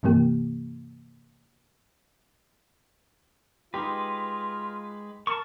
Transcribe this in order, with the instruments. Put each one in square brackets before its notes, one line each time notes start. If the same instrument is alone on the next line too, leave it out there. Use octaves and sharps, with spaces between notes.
[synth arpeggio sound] G2 C3 E3 A#3 G4
[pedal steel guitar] G#3 B4 [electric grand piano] D#4 G4 [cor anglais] F4
[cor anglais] A#4 [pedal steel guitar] A5 C#6